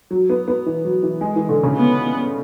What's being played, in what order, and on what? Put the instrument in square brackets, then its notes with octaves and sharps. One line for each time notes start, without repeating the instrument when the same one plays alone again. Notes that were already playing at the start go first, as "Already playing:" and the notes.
[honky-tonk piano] F#3
B3
B3
E3
F#3
E3
G#3
E3
D3
C#3
[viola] B3